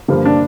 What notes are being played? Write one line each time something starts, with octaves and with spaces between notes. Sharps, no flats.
G2 D3 F3 A#3
D4